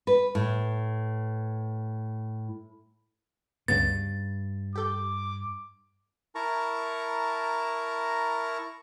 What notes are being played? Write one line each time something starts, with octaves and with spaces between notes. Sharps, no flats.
B4
A2
D2 G2 C#3 B3 A6
G4 A4 D6 G6
E4 A#4 A5 A#5 C#6